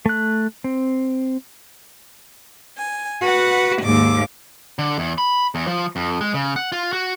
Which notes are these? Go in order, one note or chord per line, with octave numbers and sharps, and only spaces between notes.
A3 F#6
C4
G#5
F#4 B4 F#5
D#2 G#2 D6
D3
E2
B5
E2
F3
F2
G#3
C#3
F#5
F4
F#4